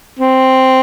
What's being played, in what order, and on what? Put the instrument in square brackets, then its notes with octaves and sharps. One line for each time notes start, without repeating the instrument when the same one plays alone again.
[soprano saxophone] C4